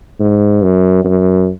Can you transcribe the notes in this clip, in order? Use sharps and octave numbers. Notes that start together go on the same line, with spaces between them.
G#2
F#2
F#2